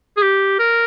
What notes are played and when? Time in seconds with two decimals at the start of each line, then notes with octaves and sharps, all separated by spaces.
0.17 G#4
0.22 G4
0.59 A#4